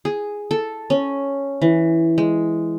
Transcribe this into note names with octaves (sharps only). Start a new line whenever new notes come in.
G#4
A4
C#4
E3
G#3